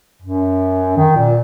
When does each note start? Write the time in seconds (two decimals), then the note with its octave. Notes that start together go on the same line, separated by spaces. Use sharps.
0.22 F#2
0.97 D#3
1.16 A#2